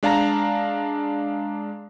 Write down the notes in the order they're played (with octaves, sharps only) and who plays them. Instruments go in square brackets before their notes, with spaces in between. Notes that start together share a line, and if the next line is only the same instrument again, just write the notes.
[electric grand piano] G#3 D4 F5 A5 A#5 A#6